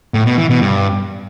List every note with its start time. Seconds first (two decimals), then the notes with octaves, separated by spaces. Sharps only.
0.14 A2
0.26 B2
0.38 E3
0.50 B2
0.62 G2